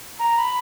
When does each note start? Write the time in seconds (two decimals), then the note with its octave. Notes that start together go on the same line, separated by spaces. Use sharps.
0.19 A#5
0.38 B5